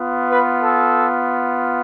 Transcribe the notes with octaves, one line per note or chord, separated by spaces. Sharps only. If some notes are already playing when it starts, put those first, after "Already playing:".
Already playing: B3 F4
B4
A4